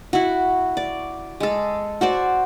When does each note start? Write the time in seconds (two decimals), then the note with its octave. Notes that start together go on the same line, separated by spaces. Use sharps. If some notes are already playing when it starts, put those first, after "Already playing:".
0.13 E4 F#4
0.77 D5
1.40 G#3 A4
2.01 F#4 C5 D5